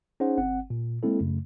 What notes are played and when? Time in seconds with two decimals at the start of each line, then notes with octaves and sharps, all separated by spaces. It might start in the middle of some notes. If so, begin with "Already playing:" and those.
0.20 C#4 D#4 G#4 C5 F#5
0.38 G1 C4 F#5
0.70 A#2
1.03 G#3 A#3 C4 E4 A4
1.21 F#2 C#3 A3